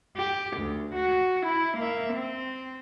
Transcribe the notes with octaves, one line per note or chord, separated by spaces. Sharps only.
G4
D2
F#4
E4
A#3 E5
C4